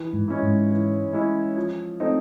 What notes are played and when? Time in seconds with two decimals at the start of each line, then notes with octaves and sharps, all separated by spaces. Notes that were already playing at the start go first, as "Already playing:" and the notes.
Already playing: E3
0.13 G#2
0.28 G#3 C#4 E4
0.42 G#2
0.71 E3
1.13 G#3 C#4 E4
1.57 F3
2.00 A3 C4 D#4